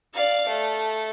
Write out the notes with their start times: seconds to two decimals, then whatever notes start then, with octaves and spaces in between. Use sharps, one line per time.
0.14 D5 F5
0.47 A3